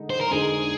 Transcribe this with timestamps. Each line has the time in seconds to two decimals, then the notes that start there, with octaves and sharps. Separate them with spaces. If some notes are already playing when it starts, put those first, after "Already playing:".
Already playing: D3 G#3 D#4
0.10 C5
0.21 A#4
0.31 D3 G#3 D#4 G#4